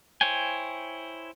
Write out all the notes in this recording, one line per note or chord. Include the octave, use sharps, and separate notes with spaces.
E4 C5 C#5 G5 G#5